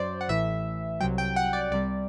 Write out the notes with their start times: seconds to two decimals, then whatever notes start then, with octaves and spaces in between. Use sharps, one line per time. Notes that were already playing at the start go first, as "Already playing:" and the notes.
Already playing: F#2 F#3 C5 D5
0.21 F#5
0.28 A1 A2 E3 E5
1.01 C2 C3 F#3 G5
1.18 G5
1.36 F#5
1.53 D5
1.71 C2 C3 G3 D5